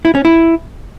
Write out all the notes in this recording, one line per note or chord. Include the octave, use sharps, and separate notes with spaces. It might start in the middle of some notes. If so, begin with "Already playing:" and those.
E4
C#4
E4